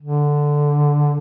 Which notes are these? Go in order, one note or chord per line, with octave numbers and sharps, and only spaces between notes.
D3